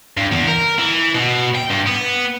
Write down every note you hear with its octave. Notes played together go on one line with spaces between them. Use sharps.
G2
E2
A#4
E3
B2
G5
G2
B3